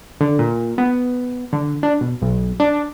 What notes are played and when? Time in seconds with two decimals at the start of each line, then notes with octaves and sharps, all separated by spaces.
0.21 D3
0.39 A#2
0.78 B3
1.53 D3
1.83 D4
2.01 B2
2.22 B1
2.60 D4